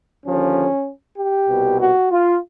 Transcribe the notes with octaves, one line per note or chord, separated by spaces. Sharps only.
D#2 D3 F3 C#4
G4
C2 B2
F#4
F4